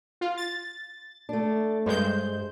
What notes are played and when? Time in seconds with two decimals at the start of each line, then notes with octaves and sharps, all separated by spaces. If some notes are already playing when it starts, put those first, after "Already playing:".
0.21 F4
0.37 A6
1.29 A3 D4
1.86 G2 G#3 C5 G6